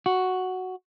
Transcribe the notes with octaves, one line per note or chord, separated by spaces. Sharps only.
F#4